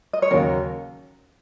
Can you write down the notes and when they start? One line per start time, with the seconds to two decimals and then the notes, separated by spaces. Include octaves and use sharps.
0.13 D#5
0.22 C#5
0.31 D#2 C#3 F#3 A#3 A#4